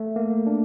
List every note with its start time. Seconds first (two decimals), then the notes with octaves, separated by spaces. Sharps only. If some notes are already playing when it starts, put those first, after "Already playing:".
Already playing: A3
0.16 A#3
0.46 D4